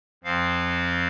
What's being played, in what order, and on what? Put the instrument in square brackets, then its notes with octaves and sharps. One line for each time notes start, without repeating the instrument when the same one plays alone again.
[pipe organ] F2 F3 C4 F5